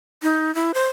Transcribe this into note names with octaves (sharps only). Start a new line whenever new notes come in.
D#4
E4
C5